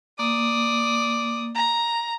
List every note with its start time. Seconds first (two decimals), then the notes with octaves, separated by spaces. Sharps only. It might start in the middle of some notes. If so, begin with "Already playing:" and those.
0.19 A#3 D5 D#6
1.55 A#5